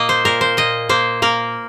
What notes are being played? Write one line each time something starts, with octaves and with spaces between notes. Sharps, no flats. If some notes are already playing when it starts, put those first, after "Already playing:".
Already playing: A#2 A#3 D#5
C5
A#2 A#4
C5
A#2 D#5
A#3 C5
A#3 A#4